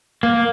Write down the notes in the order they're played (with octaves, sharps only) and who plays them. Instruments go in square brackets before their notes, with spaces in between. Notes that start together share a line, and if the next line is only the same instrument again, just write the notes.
[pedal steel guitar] A#3